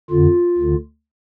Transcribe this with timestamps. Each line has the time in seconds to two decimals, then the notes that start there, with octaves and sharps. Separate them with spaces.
0.11 F2 D3 F4
0.58 D2 D3